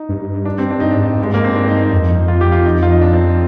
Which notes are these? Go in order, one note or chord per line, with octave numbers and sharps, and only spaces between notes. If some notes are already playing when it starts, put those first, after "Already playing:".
Already playing: D#4
G2
D4
C4
D4
G2 D#4
G#2 D4
G2
G2 G#3
G#2 A#3
G2 C4
D4
D#4
D#4
F2
F4
G4
F4
D#4
F4
D#4
D4
C4